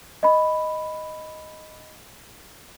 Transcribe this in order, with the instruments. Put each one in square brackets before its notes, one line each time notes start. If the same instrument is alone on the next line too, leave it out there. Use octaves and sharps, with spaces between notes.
[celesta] D#5 B5